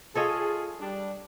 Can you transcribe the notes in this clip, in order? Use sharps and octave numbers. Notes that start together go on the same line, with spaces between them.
F4 G#4 A4 C#5 D#5
G3 D4